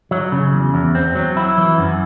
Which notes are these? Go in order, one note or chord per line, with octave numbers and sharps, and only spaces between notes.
F#3
C#3
E2
E2
C4
F#3
E4
E3
F#2